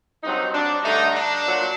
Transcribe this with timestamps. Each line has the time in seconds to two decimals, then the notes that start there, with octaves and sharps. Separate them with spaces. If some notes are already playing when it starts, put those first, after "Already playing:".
0.23 G2 F#3 C4 D#4
0.53 D4
0.83 G2 D3 A3 D#4
1.14 D4
1.45 A#2 F#3